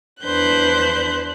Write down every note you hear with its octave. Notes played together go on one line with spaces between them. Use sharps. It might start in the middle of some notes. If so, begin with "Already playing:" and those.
E2 D4 B4 C5 F#6 G6